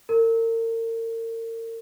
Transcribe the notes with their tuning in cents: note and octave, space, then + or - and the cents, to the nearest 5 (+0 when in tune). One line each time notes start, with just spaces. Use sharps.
A#4 -40